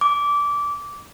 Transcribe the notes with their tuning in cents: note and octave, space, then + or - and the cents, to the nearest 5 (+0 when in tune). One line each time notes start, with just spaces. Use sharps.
D6 -20